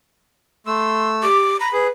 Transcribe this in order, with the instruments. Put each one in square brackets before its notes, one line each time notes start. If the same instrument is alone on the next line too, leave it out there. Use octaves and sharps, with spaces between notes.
[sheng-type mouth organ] A3 E6 [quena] C6
[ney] G4 [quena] D6
[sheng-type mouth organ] A#5 [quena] B5
[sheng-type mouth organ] G#4 [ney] B4